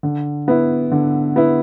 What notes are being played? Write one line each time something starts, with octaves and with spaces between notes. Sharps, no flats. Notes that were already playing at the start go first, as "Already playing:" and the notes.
D3
B3 E4
D3
B3 E4